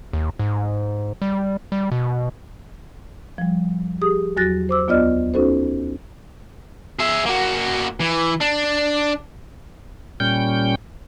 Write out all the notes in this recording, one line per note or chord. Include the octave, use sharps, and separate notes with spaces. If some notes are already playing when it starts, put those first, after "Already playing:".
D#2
G#2
G3
G3
B2
F3 G3
G4 G#4 D#6
E2 F#3 F#4 F#6 A6 A#6
C5 D6 E6
D2 B3 F4 D5 D#5 F6
C#4 D#4 F#4 A4 C5
G#4 E5
A#3 F#4
E3
D4
A#2 G3 C#4 G5 G6